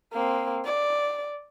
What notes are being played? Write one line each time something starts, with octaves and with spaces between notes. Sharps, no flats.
A#3 C4
D5